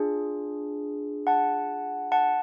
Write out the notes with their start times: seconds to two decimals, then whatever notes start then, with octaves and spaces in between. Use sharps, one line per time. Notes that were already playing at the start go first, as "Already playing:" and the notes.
Already playing: D4 F4 G#4
1.27 F#5 A5
2.12 F#5 A5